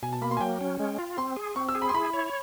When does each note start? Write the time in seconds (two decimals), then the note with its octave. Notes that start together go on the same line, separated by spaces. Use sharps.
0.03 B2 G#5
0.12 A5
0.22 A#3 B5
0.31 C6
0.37 G#5
0.41 F#3 G5
0.61 C#4
0.80 G#3
0.99 F4
1.18 C4 C6
1.36 G#4
1.56 C4 C#6
1.69 E6
1.75 G#4
1.82 B5
1.89 C6
1.94 E4 B5
2.13 C#5